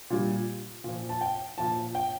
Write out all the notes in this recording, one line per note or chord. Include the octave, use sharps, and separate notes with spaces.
A#2 G3
A#2 F3
A5
G5
A#2 F3 A5
G5